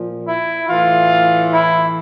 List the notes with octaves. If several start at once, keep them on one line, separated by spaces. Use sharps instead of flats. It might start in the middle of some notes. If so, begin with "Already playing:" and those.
Already playing: A#2 F3
E4
A2 E3 F4
E4